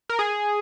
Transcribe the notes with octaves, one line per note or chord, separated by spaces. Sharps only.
A#4
G#4